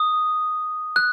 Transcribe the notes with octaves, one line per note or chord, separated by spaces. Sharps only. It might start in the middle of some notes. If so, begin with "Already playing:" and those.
Already playing: D#6
F#6